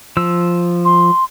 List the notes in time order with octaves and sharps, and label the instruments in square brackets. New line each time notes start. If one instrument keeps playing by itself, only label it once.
[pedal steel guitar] F3 E6
[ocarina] C6